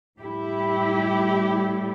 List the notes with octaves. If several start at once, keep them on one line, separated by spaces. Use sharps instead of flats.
A2 G3 E4 G4